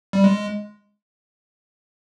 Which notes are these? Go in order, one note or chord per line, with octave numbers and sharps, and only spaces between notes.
G3
G#3